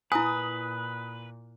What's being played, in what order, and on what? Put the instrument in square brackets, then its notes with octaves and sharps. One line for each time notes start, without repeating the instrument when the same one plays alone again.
[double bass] A#2 [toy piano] E4 G#5 [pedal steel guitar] B4 [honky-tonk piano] D#6